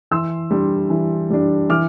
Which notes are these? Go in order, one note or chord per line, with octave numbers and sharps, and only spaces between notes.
E3 C6 E6
G3 D4
E3
G3 D4
E3 D6 F6